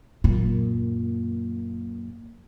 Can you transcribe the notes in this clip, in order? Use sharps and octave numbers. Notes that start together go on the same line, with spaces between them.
F#2 A#2